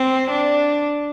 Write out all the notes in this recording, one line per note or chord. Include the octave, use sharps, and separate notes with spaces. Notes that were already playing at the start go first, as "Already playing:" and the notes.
Already playing: C4
D4